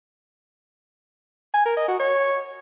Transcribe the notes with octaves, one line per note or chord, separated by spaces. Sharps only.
G#5
A#4
D#5
F#4
C#5